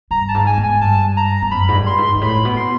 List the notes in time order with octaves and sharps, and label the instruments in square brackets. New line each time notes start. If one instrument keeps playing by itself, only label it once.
[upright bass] G2 [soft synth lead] A#5
[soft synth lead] A5
[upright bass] G#2
[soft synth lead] G#5
[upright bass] G#2
[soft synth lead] G#5
[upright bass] G2 [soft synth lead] A5
[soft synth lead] A#5
[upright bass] G2
[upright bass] F#2 [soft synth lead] B5
[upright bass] G#2
G2
[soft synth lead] C6
[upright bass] G#2
G#2
[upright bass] A2 [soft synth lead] B5
[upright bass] B2
[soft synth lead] C6